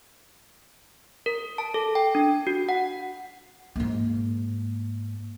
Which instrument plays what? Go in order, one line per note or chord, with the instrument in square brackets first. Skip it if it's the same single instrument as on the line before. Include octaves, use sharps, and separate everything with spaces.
[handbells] A#4
A5
A4
G5
D4
F#4
F#5
[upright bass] G#2 A#3